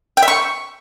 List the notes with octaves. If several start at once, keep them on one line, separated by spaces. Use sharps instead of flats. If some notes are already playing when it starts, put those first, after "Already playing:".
G5
E5
C#6